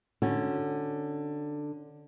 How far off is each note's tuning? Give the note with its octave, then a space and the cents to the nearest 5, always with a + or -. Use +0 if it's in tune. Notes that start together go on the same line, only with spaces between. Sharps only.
D3 +10 C#4 +0 F#4 +0